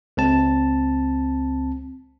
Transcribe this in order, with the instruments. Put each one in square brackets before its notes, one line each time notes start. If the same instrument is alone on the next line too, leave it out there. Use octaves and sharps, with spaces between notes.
[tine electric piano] C#2 C4 A5